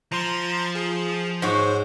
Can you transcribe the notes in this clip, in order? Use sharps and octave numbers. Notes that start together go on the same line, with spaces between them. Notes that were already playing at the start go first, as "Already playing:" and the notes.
F3 A#5 C6
G#4
G#2 F#4 C5 C#5